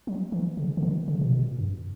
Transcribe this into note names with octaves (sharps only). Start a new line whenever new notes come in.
F#3
E3
C#3
C#3
D#3
C#3
B2
A#2
F#2